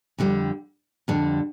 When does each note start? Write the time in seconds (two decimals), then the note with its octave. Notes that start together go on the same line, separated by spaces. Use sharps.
0.18 F2 D3 G3
1.08 F2 D3 G3